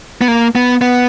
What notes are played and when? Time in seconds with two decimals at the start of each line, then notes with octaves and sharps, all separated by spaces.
0.21 B3
0.28 A#3
0.55 B3
0.81 B3